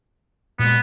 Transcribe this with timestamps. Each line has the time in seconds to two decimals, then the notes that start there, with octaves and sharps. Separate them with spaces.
0.59 A#2 G#3 B3